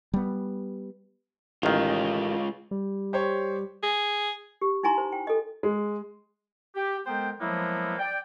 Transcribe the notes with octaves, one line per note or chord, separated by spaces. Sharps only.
G3 B3
A1 D#3 G#3 F4
G3
G4 C5 C#5
G#4
G4
D#4 E4 G#5 A#5 C6
C5
G5
A4 D#5
G#3
G4
G#3 B3 A4 A#4 C5 G5
F3 F#3 G#3 A#3 B3 E4
D5 G5